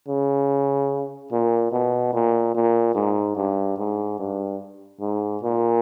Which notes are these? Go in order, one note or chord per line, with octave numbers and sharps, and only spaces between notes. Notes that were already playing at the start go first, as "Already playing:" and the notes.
C#3
A#2
B2
A#2
A#2
G#2
G2
G#2
G2
G#2
A#2